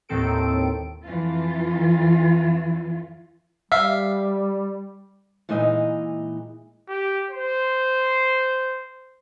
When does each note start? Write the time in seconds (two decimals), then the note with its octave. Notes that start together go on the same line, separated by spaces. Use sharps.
0.09 D#2 A2 D#3 C4 A4 D7
1.05 F2 E3 F4
3.72 G3 E5 F5
5.49 A#2 E3 G#3 D#4 D#5 G#5
6.89 G4
7.30 C5